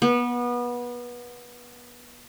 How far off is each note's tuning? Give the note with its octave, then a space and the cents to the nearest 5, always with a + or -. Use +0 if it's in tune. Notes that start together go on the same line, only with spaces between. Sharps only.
B3 -25